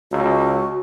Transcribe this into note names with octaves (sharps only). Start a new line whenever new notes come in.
C#2 F#4